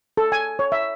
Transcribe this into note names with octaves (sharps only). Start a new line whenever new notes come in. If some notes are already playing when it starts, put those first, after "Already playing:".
A4
G#5
C#5
E5